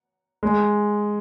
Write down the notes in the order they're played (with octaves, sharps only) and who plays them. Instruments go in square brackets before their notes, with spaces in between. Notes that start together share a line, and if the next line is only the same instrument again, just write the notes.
[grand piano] G#3